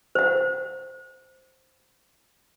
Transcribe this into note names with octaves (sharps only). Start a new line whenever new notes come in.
C5 F#5